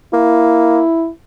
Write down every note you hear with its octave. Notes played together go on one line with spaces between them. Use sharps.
A#3 E4